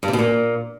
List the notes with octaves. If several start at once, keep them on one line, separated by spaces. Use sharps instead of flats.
G2
C3
B2
A#2